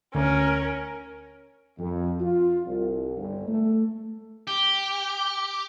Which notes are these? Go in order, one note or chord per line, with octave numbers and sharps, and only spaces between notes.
D2 C#4 A#4
F2
F4
C2
G1
A3
G4